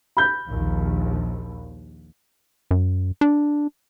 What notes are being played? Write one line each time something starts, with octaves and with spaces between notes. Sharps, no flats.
B5 G6
A#1 D#2
F#2
D4